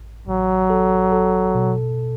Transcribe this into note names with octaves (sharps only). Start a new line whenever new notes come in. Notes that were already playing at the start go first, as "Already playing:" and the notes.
Already playing: A1
A1 F#3
A4
A4
B2